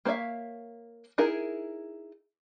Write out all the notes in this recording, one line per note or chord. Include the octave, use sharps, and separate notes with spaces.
A#3 C5 C#5 E5 F5
D#4 E4 G#4 A#4